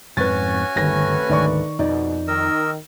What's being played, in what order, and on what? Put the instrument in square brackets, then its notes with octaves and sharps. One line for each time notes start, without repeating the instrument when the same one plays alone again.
[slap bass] F2 G#2 C4 [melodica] C#4 F#4 G#5 [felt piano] B4 A6
[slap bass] G1 [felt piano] D#2 A#6 [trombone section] C3 A3 B4
[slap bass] G#1 D2 [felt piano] D#3 D5 C#6
[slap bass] F2 [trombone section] B2 [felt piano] D#4 D5
[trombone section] D#3 [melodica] A#4 D#5 E6